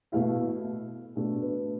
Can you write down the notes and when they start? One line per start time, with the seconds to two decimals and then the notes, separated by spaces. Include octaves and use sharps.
0.12 B2 A3 E4 F5
1.15 B2 A3 D4 A4
1.42 B4